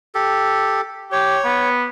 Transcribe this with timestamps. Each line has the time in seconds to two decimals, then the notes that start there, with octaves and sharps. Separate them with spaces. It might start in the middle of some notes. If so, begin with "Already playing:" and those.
0.15 G4 A4
1.12 G4 C#5
1.45 B3